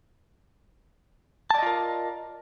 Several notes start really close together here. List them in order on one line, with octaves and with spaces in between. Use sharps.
A5 D5 D#5 F4 A#4